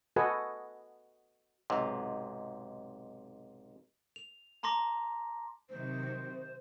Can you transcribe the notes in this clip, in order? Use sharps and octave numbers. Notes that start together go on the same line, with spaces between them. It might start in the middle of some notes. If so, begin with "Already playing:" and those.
F#4 A4 B4 D#5 F#5 G#5
B1 G#2 C3
F7
A5 A#5 C6 D6 A#6
C3 D#3 F#3 C5